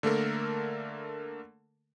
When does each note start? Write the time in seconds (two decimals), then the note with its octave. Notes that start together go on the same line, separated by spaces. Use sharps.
0.03 D3 A3 A#3 A4 A#4